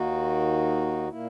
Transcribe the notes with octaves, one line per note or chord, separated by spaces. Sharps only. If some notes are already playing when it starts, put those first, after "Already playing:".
Already playing: D#2 D#3 A#3 D#4 F#4
A#2 A#3 E4